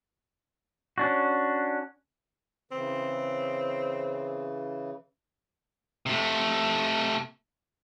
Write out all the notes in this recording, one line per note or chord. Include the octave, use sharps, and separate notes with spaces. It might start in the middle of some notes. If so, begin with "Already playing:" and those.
C#4 D4 F#4
C#3 E3 C4
C3 A3